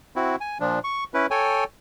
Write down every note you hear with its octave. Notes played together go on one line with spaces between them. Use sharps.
C4 E4 F#4
G#5
A#2 F3 D4
C#6
C#4 E4 B4
A4 C#5 G5 G#5